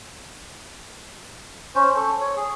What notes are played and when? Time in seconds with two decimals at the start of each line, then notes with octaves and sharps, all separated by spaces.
1.75 C#4 C5
1.96 A4
2.21 C#5
2.36 G#4